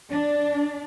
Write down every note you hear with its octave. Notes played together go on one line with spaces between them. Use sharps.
D4